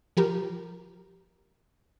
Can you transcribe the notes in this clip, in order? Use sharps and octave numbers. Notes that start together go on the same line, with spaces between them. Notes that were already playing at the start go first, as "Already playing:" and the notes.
F3 G4 A#4